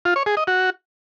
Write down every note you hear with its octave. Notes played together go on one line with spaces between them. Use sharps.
F4
C#5
G#4
D#5
F#4